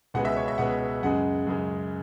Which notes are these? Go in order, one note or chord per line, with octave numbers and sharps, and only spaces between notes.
C#2 B2 G#3 F#5
E5
C#5
E5
C#2 B2 G#3 F#5
F#2 C#3 G#3 F#5
F#2 C#3 G#3